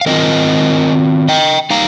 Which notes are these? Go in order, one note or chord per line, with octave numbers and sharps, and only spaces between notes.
F5
D#3 C4 F4 A#4 D#5
D#5 G5
G3 D#4 F5 A#5